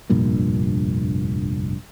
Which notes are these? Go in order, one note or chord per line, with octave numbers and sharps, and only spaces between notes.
F1 A#1 G2 A#2